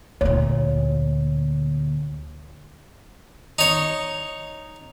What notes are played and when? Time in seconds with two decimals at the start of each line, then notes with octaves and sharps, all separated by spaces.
0.21 D2 A#2 C#5
3.59 D#4 C#5